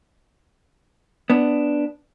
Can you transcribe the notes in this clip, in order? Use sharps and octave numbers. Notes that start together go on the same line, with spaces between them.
B3 D4